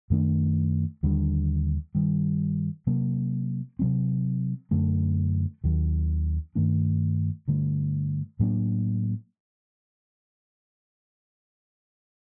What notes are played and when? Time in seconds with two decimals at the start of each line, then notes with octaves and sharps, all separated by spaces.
0.10 F#2 D#3 A3 D4
1.03 D#2 D3 G3 D4
1.95 G2 D#3 G3
2.87 C3 F#3 A#3
3.79 C3 F#3 C4
4.71 F#2 D3 A3
5.64 D#2 D#3 F#3
6.55 G2 D#3 A3 D4
7.48 G2 D3 A3
8.39 A2 F#3 A#3 D4